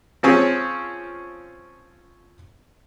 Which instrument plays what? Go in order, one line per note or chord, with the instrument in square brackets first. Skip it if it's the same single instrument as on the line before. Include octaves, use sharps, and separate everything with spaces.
[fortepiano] F3 C4 C#4 G#4